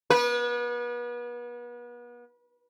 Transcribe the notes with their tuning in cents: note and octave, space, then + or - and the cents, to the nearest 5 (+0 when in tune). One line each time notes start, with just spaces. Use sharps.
B3 -35 B4 -35